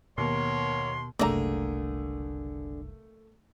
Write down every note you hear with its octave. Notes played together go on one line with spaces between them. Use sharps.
D#2 B2 B3 A#4 C#5 C6
F#1 C2 D3 A3 A#3 G#4 D5 A#5